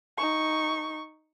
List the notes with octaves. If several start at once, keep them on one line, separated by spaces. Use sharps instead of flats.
D#4 C#6